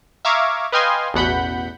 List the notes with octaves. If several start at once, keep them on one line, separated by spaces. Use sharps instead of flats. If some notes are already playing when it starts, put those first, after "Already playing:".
E5 F5 A#5 C#6 D6 G#6
B4 D#5 F5 G5 G#5 C6
A1 E2 B2 F#5 B5 G6